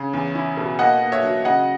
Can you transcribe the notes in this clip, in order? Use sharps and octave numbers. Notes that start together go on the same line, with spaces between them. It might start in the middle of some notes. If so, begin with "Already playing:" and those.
Already playing: C#3 C#5
E2
E4
B2
A#3 D#5 F#5
A#3
C#5 E5
F#3
C#3 D#5 F#5